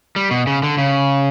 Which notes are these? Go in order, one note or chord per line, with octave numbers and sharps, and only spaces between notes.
G3
B2
C#3
D3
C#3